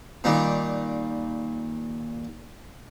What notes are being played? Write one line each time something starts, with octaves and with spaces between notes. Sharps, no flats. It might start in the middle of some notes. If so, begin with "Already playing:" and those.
A#2 D#3 G3